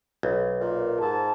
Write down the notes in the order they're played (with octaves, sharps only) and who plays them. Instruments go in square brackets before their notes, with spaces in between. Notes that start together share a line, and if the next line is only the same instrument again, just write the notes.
[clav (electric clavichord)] B1
[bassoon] A#2
[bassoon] G#2 [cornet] A5